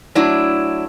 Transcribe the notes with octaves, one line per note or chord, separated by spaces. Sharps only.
F#3 A3 D4 E4